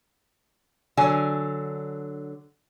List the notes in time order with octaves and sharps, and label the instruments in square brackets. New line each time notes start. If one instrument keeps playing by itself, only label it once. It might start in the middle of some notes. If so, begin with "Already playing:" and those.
[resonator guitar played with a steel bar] D3 F#3 G#5